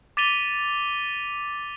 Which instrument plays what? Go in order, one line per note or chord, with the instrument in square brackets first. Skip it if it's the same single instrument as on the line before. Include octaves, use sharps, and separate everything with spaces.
[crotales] D6 A6 B6 D#7 F7 G7